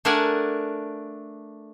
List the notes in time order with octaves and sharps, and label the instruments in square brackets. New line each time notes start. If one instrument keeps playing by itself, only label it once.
[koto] A3 D4 A#4 D5 F#5 G#5